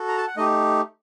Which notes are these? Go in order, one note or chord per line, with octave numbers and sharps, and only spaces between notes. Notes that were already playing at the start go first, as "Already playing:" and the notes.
Already playing: F#4 A4
A#5
A5
F#5
A3 D#4 G4 D#5